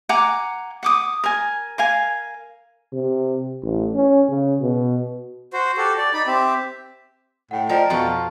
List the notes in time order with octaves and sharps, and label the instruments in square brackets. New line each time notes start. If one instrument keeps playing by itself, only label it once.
[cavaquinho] F#5 G#5 A#5 D6
F#5 D6 D#6
A#4 G#5
A#4 F5 G#5
[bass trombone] C3
A1
C#4
C#3
B2
[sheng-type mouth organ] F#4 C5
F#4 G4 A4
D5
D#4 D5 B5
C4 G4 E5
[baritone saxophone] A2 [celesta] F#5 G5
[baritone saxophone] F3 [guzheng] A#4 [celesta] D5 D#5 G5
[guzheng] F2 F4 [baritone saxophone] B2 [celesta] A5 C#6